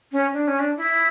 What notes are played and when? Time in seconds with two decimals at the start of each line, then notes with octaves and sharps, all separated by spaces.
0.12 C#4
0.33 D4
0.47 C#4
0.60 D4
0.77 E4